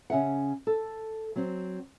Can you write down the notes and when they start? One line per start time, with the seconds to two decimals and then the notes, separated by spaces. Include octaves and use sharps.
0.10 C#3 C#4 E5 F#5
0.67 A4
1.36 F#3 C4